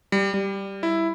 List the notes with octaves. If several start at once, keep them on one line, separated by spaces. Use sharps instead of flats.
G3
G3
E4